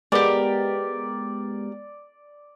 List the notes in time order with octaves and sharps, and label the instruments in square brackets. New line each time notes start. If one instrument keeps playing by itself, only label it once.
[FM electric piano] G#3 B3 [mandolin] G4 A#4 [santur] D5